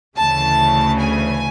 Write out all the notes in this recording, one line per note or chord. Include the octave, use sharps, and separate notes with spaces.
D2 C#3 E3 A3 A5
G#5